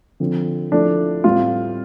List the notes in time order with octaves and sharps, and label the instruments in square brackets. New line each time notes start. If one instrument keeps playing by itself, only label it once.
[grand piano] D3 F3 C4
[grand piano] F3 A3 E4 A4 [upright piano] D4
[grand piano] A2 G3 C4 [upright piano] F4